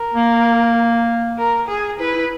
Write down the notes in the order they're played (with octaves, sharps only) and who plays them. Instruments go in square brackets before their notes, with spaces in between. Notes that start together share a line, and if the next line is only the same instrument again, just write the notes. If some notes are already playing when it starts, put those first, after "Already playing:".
Already playing: [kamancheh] A#4
[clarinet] A#3
[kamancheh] A#4
G#4
[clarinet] E4 [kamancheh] B4
[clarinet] E4